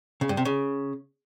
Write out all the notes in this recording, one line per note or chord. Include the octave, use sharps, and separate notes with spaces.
C#3
G2
C3
C#3